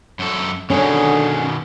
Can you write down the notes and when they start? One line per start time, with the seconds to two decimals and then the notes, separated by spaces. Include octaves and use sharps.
0.19 F#2 A4
0.70 B2 D3 D#3 C#4 G#4